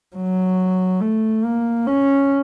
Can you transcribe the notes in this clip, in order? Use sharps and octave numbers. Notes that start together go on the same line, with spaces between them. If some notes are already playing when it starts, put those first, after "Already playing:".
F#3
A3
A#3
C#4